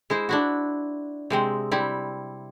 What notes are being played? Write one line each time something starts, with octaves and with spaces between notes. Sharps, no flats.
G#3 E4 C5
D4 E4 F#4
C3 G#3 C4
G3 C4 E4